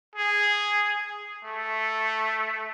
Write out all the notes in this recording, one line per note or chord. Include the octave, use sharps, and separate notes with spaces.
G#4
A3